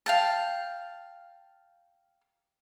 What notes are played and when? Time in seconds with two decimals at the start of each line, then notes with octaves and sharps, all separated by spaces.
0.06 F5 G5 A5